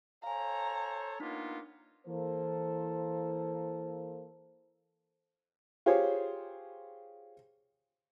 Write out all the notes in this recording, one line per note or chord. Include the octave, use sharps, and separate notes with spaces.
A4 C5 C#5 F5 G#5 A#5
A#3 B3 D4 D#4 F4 B6
E3 A#3 A4 C5
F4 G4 G#4 C5 C#5